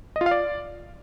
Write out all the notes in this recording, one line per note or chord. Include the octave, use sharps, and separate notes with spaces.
D#5
F4
F5
D5